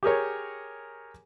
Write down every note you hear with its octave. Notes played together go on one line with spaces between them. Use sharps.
G4 G#4 A#4 C#5